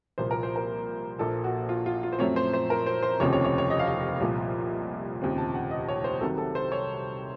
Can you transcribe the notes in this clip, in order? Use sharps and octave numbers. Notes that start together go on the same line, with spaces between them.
C2 A#2 F3 A#3 C5
A#4
C5
A#4
A#1 A#2 F3 A#3 A4
F#4
F4
F4
F4
C5
F#2 F3 A3 C4 C#5
C5
C5
A#4
C5
C5
F1 D#2 C#3 F3 C4 C#5
C#5
C#5
C#5
D#5
F5
D#5
C2 A#2 F3
F1 D#2 C#3 F3 C4
A5
F#5
D#5
C#5
C5
C2 C3 D#3 F#3 A4
A4
C5
C#5